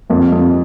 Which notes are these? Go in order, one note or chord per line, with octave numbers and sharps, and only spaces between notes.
F2 A#3
F2